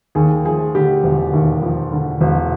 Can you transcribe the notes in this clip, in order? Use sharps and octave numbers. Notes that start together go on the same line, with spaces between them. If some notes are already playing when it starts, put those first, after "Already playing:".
D#2 G#4
F3 G#4
D3 G4
E1
D#2
F3
D3
E1